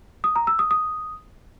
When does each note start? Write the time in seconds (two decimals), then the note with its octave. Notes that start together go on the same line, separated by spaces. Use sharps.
0.24 D#6
0.36 A#5
0.47 E6
0.59 D#6
0.71 D#6